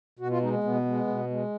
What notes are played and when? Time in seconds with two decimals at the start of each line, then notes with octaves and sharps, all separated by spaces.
0.19 B2 F#4
0.31 F4
0.42 G#3 D#4
0.53 B3
0.63 B2 B3
0.85 G#3
1.07 B2
1.30 G#3